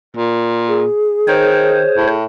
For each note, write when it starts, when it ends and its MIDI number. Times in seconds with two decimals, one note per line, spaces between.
0.17 0.84 46
0.68 2.15 68
1.28 1.84 51
1.28 2.07 72
1.28 2.07 73
1.97 2.25 45